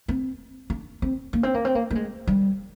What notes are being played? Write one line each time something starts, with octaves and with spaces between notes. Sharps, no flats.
C4
D4
C4
A#3
C4
A#3
C4
A#3
A#3
G#3
G3